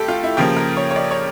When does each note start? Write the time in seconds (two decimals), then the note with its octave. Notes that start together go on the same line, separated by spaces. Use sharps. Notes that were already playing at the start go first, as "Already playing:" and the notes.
Already playing: A2 G4 A4
0.08 F4
0.23 E4
0.37 C#3 F3 A#3 G4
0.56 A#4
0.77 C#5
0.91 C#5
0.96 D5
1.11 C#5